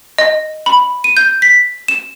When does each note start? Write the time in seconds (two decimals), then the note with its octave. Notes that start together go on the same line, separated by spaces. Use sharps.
0.18 D#5
0.66 B5
1.04 D#7
1.17 G6
1.42 B6
1.88 E7